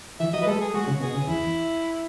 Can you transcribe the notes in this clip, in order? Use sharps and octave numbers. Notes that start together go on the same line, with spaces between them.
E3 E5
F#3 D#5
B4
G#3 A4
G#4
G#3 F#4
C#3
B2 G#4
C#3
E2 E4